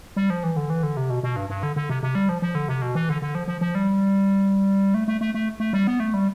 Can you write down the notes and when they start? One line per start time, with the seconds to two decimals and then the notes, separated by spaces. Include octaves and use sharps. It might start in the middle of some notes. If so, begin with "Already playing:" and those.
0.16 G3
0.30 F3
0.44 E3
0.57 D3
0.70 E3
0.83 D3
0.97 C3
1.10 B2
1.23 B2
1.36 G2
1.49 G2
1.63 D3
1.76 D3
1.89 C3
2.03 C3
2.15 G3
2.29 F3
2.42 F3
2.55 D3
2.68 C3
2.82 B2
2.95 E3
3.09 D3
3.22 D3
3.35 F3
3.48 F3
3.61 F3
3.75 G3
4.94 A3
5.08 A3
5.21 A3
5.34 A3
5.60 A3
5.73 G3
5.87 B3
6.00 A3
6.14 G3